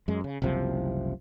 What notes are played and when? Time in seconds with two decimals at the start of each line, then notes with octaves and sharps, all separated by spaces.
0.08 F#2 G#3
0.24 C#3
0.42 F#1 C2 C3 F3